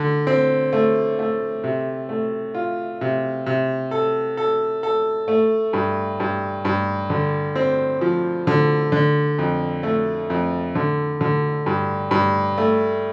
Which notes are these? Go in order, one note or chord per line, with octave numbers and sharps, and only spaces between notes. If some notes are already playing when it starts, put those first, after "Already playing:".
Already playing: D3
C4
A3
A3
C3
A3
F4
C3
C3
A4
A4
A4
A3
G2
G2
G2
D3
C4
F3
D3
D3
F2
A3
F2
D3
D3
G2
G2
A3